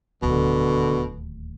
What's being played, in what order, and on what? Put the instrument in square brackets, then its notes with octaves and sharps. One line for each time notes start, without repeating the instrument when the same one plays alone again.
[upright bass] D1 D#2 [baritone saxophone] B2 [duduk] D3